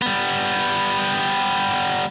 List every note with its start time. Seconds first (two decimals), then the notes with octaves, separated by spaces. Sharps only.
0.02 G3 B3